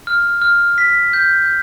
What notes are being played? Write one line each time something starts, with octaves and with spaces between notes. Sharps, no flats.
F6
F6
B6
G6